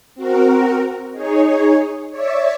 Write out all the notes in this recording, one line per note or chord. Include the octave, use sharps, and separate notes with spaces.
C4 F#4 A#4
D#4 G#4 C#5
C#5 D5 E5